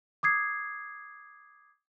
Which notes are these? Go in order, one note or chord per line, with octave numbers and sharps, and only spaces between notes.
D6 D#6 G#6 C7